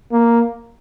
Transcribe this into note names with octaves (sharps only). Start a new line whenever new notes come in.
A#3